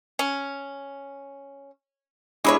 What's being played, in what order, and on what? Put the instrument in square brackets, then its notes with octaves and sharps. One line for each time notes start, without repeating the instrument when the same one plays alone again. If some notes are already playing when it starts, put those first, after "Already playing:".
[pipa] C#4
[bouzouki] G#3 B4 C#5 [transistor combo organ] D4 E4 G#4